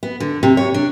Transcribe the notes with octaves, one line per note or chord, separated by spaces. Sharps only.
B3
D3
C3
C#5
D4